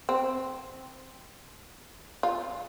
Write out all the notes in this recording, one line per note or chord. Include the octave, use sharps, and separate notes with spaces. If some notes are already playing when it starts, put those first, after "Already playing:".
C4
F4